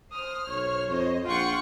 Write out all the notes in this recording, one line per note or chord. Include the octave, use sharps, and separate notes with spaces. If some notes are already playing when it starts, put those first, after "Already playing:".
C5 D#6 F6
B1 C#5
F2 C5 D#5
A#1 F4 F#5 G5 C#6